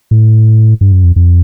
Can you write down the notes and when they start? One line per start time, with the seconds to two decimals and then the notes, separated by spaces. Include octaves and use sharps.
0.11 A2
0.81 G2
0.92 F#2
1.04 F2
1.16 F2